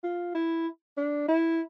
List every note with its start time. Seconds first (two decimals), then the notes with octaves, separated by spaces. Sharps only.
0.04 F4
0.35 E4
0.97 D4
1.28 E4